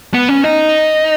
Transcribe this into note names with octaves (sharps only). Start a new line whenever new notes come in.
B3
C#4
D#4